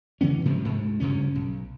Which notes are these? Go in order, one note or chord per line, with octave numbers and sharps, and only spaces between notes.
C#3 E3 B3 C#4
G#2 C3 F3 F#3
D2 G#2
D2 G2 C#3 C#4
B1